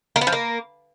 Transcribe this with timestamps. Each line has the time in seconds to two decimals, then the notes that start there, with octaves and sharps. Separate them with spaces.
0.16 A#3
0.21 B3
0.27 F3
0.33 A#3